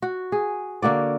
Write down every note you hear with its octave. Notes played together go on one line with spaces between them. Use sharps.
F#4
G#4
D3 A#3 F#4 D5